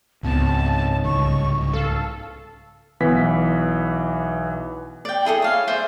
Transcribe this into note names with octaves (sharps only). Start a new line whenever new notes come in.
C#2 G#2 B3 C4 A5
C2 G#2 C#3 C#6
A4 F5
B1 E3 B3 B6
D5 G5
E4 G#4 A4 D#5
C#5 F5
C5 D5 E5 G#5